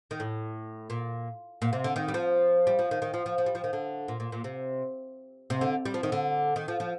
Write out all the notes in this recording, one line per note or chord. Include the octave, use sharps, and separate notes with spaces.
D#3
A2
A#2
A#2
C3
D3
D#3
G3
F3
G3
F3
D#3
D#3
F3
F3
F3
G3
F3
D#3
D3
A#2
A#2
A#2
C3
C3
D3
G3
F3
D#3
D3
D#3
F3
F3